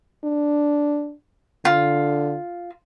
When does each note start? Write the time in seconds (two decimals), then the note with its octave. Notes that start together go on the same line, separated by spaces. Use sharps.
0.24 D4
1.65 D3 F4